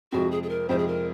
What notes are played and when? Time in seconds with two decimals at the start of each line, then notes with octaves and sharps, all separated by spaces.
0.12 F2 C3 F3 G#3 F#4
0.31 G#4
0.43 G#4
0.49 A#4
0.69 F2 C3 F3 G#3 C5
0.78 G#4
0.88 A#4